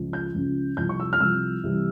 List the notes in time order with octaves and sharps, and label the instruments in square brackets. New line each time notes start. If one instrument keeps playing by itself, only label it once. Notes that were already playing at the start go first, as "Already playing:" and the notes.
Already playing: [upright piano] C#2 C#3 F3
G6
C#2 C#3 F3
C2 C3 F3 G6
C#6
E6
F6
C2 C3 F3 E6
C2 C3 E3 G3